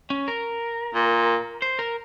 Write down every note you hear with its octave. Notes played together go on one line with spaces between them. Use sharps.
C#4
A#4
A#2
C5
A#4